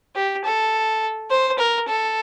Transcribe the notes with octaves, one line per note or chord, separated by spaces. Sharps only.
G4
A4
C5
A#4
A4